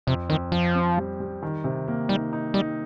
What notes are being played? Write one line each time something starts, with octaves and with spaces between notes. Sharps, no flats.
F2 C3
F2 D#3
F2 F3
C4
G3
G3
D#3
C3
A#3
G3 D#4
D#4
G3 D#4